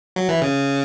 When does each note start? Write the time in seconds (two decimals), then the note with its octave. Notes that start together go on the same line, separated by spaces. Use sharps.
0.16 F#3
0.29 E3
0.42 C#3